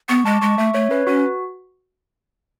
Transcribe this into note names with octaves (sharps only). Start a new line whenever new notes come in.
B3 C#6
G#3 A5
D6
G#3 C#6
A3 E5
A3 C#5
C#4 B4
C#4 F#4